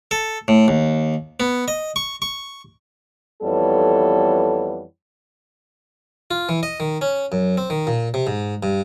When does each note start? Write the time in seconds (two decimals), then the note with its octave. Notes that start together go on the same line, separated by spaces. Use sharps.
0.11 A4
0.48 A2
0.68 D#2
1.40 B3
1.68 D#5
1.96 C#6
2.22 C#6
3.42 F2 E3 G3 B3 A4 C#5
6.31 F4
6.49 E3
6.63 D#5
6.80 D#3
7.01 C#4
7.32 F#2
7.58 C4
7.70 D#3
7.87 A#2
8.14 C3
8.27 G#2
8.63 G2